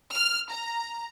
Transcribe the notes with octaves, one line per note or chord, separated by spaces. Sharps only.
F6
A#5